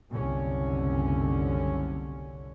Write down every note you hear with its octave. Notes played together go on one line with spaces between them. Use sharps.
F#1 C2 D3 C#4